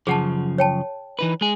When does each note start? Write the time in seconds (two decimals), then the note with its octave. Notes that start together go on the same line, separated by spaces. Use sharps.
0.07 F#2 C#3 F3 G#4 F#5 A5
0.58 C#5 G5 A5
1.19 E3 D#4 B4
1.41 G#3 G#4